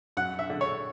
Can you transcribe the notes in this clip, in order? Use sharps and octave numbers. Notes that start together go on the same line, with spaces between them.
F#2 F#5
E5
D3
C#5